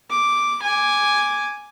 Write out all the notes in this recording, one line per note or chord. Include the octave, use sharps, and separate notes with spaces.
D6
G#5 D6